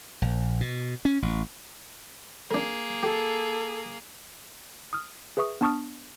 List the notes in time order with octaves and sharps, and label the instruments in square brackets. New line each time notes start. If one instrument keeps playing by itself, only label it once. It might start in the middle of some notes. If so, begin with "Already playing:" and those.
[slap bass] A#1
B2
C#4
A1
[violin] A#3 G#4 [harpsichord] D4 A#4
[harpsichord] G4 [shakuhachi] A4
[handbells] D#6 F6
G#4 B4 E5 C#6 D#6
B3 D4 A5 C#6 D#6 F6